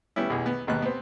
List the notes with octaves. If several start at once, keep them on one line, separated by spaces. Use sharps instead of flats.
G3 B3 C#4 E4
B1 E2 G#4
B3
G#1 D#2 B2 B3 F#6
B3 C4